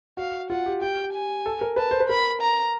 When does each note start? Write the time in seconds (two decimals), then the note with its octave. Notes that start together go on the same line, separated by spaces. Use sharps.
0.17 F#4 F5
0.50 F4 F#5
0.66 G4
0.81 G4 G5
1.13 G#5
1.46 A4
1.61 A#4
1.76 B4 A5
1.91 C5
2.00 B4
2.09 A#4 B5
2.41 A#5